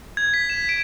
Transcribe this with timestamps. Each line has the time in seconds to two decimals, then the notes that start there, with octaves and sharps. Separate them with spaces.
0.17 G#6
0.34 B6
0.49 E7
0.69 D7